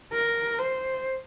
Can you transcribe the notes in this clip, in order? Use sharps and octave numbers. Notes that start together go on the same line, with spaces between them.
A#4
C5